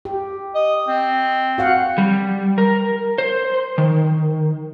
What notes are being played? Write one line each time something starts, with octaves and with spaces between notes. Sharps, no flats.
G4
D#5
C4
F#4 F5 F#5
G3
A#4
C5
D#3